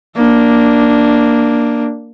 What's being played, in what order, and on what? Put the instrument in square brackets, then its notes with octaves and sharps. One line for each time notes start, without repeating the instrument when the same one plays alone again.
[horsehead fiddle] A#3 D4